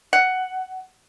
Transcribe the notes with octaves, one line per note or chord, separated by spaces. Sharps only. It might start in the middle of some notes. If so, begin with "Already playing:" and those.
F#5